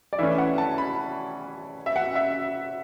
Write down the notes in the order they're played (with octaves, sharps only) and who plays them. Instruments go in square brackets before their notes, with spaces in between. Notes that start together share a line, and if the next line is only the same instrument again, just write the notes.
[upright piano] D5
[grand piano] E3 A3 C#4 [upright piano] E5
[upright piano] F#5
A5
B5
E5
F#5
E5